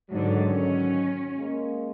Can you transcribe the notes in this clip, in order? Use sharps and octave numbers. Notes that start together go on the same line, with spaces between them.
G#2 D3 D#3 F#3
C#4
G#3 A#3